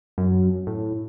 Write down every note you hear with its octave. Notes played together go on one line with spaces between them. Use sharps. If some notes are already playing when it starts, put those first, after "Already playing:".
F#2
A2